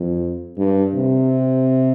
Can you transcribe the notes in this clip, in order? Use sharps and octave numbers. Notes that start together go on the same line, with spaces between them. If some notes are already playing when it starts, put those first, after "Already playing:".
Already playing: F2
G2
C3